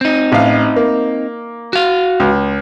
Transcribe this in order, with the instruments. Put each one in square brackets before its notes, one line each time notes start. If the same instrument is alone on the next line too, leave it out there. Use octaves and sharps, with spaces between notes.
[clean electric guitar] C4 D#4
[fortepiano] A1 F5
A#3
[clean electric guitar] F#4 F5
[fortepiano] C#2